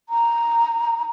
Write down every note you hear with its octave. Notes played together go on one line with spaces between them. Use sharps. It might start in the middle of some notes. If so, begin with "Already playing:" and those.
A#5